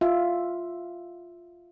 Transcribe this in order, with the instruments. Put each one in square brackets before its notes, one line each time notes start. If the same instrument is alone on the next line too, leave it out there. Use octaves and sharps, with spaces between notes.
[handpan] F4 E5 F5